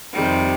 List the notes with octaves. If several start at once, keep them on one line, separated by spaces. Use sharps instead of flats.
F2 C3 D#3 G3